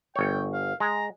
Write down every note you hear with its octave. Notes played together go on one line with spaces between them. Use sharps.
G1 C#5 G5
F5
G#3 A#5